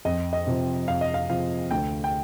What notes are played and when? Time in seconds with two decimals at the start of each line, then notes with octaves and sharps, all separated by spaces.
0.05 F2 D#5
0.33 D#5
0.47 C3 F3
0.88 F2 F5
1.01 D#5
1.14 F5
1.29 C3 F3 F5
1.71 D2 G5
2.04 G5